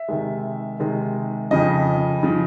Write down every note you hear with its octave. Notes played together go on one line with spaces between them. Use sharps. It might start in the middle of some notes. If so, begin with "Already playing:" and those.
Already playing: E5
C3 D#3 G#3
C3 D#3 G#3
F2 C#3 F3 D#5
C#3 F3